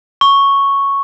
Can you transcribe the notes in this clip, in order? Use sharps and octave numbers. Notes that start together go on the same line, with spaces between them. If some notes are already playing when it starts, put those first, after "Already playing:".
C#6